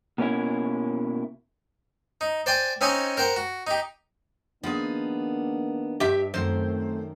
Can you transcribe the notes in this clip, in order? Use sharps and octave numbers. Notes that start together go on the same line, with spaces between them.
B2 A#3 C#4 E4
D#4
C5 D5 G5 G#5
C4 C#4 D#4 D#5 G#5 C#6
A#4 C5 F#5 G5
F#4
D#4 G4
D#3 F3 A#3 B3 D4 G#4
G2 G4 E5
F#2 D#3 A3 C4 C5